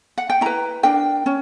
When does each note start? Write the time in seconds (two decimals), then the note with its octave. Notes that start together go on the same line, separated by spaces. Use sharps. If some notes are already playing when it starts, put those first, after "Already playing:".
0.18 F#5
0.30 G5
0.41 E4 B4 A#5
0.83 D4 A#4 G5
1.26 C#4